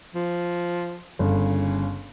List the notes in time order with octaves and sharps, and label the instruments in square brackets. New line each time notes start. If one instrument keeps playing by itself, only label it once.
[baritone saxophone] F3
[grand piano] G1 [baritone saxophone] C#3